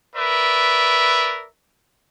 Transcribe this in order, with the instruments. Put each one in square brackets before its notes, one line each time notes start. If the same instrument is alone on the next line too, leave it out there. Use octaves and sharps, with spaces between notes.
[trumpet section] A#4 B4 D5 E5